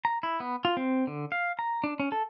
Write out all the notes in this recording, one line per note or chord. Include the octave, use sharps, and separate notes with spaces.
A#5
E4
B3
F4
C4
D3
F5
A#5
D4
C#4
A4